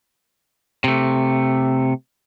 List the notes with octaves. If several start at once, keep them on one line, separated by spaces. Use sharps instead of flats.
C3 A3